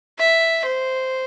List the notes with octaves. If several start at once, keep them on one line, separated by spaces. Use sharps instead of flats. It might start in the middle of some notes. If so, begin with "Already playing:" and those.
E5
C5